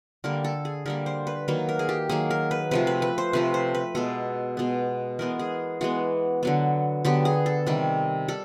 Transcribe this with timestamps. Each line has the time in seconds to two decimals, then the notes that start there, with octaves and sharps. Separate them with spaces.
0.24 D3 G3 A#3 A#4
0.45 A4
0.65 G#4
0.86 D3 G3 A#3 A#4
1.06 C5
1.27 B4
1.48 D#3 F#3 A#3 B4
1.69 A#4
1.79 G#4
1.89 G4
2.09 D#3 F#3 A#3 G#4
2.31 A#4
2.51 B4
2.71 C3 F3 A3 B4
2.87 B4
3.02 B4
3.18 C5
3.33 C3 F3 A3 B4
3.54 C5
3.75 B4
3.95 B2 G#3 B3 A4
4.57 B2 G#3 B3
5.19 E3 G#3 B3 A#4
5.39 G#4
5.81 E3 G#3 B3 F#4
6.43 D3 F#3 B3
7.05 D3 F#3 B3 G4
7.25 G#4
7.46 A4
7.66 C3 D#3 G3
8.28 G3 A4